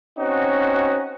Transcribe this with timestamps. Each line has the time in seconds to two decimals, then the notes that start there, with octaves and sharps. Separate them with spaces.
0.19 C4 C#4 D#4 F#4